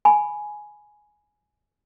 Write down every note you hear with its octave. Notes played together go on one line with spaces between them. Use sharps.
G#5 B5